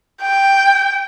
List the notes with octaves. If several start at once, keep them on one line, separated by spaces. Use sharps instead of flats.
G5